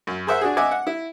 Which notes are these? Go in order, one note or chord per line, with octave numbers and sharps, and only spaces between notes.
F#2
G#4 A#4 C5 E5 F#5
D4 F#4 G#4
D#5 E5 F#5 G#5 D6
F#5
E4